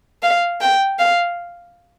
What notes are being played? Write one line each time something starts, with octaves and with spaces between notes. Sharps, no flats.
F5
G5
F5